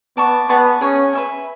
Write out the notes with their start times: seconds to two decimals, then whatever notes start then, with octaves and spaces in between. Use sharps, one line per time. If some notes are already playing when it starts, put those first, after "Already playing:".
0.17 B3 D5 A5 C#6
0.49 B3 G#4 D5 A5 C#6
0.81 C#4 G#4 C#5 F#5 C#6
1.13 B4 E5 G#5